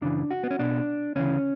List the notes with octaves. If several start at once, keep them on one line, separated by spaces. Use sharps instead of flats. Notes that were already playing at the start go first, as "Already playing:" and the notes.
F#2 C#3 E3 D4
F#4
B3
C#4
B1 B2 D4
D2 C#3 E3 C#4